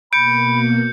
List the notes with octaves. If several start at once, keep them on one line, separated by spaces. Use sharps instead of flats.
B2 A#3 B5 G6 C#7 D7